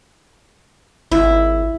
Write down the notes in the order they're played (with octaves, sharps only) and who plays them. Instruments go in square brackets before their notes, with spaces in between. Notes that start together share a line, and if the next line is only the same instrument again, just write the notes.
[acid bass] G#1 [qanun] E4